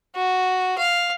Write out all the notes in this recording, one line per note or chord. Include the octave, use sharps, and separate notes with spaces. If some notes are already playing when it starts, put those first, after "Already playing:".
F#4
F5